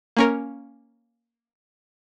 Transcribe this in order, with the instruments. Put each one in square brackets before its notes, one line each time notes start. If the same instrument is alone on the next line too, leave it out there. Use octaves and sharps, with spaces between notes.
[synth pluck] A#3 C#4 A#4